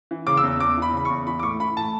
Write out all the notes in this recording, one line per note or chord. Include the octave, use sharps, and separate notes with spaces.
E3
C#3 D6
E6
E2
E2 D6
E3 B5
C#3 B5
E2 C#6
E3 B5
D6
A2 C#6
E3 B5
A2 A5